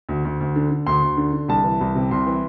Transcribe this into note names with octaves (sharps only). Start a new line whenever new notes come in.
D2
D2
D2
D3
D3
D2 C6
D2
D3
D3
C2 A5
E3
C2
C3
C2 C6
E3